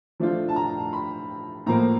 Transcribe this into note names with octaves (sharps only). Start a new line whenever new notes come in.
F3 A3 D4 F4
A5
A#5
B5
A2 F3 A#3 A#5